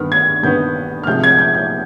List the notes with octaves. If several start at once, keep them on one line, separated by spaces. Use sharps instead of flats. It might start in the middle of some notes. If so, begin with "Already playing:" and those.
Already playing: G2 D#3 B3 F6
G#6
G2 D#3 B3 G6
F6
C3 F3 G#3 G6
G#6
G6
G6